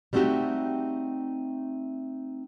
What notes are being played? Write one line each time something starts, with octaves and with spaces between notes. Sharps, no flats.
G3 A3 C4 D#4 F#4 G4